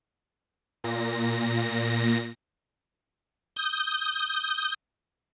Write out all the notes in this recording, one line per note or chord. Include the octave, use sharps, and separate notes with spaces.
A#2 A#6
D#6 G6